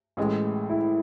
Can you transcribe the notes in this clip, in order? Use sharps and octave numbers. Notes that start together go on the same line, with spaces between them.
A1 A2 G#3
E4